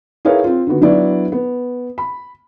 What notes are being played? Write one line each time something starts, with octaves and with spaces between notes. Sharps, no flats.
E4 G#4 A#4 B4 C#5 F5
C4 F4
D3 D#3 B3 F#4
F#3 B3 D4 E4 D5
B3
B5